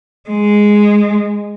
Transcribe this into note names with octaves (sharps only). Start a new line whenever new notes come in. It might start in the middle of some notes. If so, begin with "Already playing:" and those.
G#3